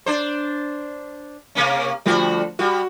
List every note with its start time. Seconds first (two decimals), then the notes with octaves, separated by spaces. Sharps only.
0.06 D4 C5
1.55 C3 A#3 C#4
2.06 D3 F3 G3 A3 F#4
2.59 G3 F#4